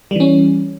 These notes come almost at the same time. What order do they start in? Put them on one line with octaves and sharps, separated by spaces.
G3 E3 C#4